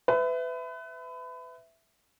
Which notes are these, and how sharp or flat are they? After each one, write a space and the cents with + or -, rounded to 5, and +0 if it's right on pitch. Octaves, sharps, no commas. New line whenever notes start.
B4 +30 E5 +0